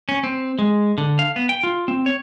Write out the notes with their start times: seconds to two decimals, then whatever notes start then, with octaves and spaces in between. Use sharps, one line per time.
0.09 C#4
0.24 C4
0.59 G#3
0.98 D3
1.19 F5
1.36 B3
1.49 G5
1.63 F4
1.88 C4
2.06 C#5